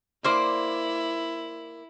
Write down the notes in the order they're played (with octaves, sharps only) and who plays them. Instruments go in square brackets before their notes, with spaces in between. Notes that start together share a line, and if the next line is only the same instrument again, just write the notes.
[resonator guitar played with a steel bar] A#3 C5 D5 [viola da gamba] E4